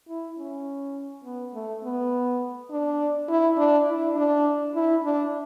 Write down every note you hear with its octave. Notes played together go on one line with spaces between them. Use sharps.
E4
C#4
B3
A3
B3
D4
E4
D4
E4
D4
E4
D4